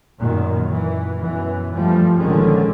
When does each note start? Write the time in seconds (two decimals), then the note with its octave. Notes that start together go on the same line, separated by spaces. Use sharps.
0.19 F#2 A#2 D#3
0.69 E3
1.17 F#2 B2 E3
1.72 G2 F3 G3 A3
2.17 A#1 A#2 D3 D#3 G#3 C#4